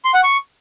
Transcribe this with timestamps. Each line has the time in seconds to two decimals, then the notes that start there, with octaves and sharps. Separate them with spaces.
0.05 C6
0.14 F#5
0.23 C#6